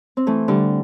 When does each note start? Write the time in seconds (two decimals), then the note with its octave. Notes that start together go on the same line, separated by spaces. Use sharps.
0.17 C4
0.27 E3 A3
0.48 D3 G3